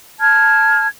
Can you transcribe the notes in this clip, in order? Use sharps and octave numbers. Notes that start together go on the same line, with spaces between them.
A5 F6 G#6